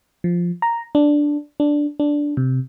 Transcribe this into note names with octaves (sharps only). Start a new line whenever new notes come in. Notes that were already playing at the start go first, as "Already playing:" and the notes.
F3
A#5
D4
D4
D4
C3